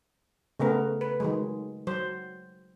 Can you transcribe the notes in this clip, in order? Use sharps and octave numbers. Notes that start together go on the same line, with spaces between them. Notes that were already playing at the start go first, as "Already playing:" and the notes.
C#3 A3 B3 A#4
B4
D#3 F#3 G#3
F#3 C5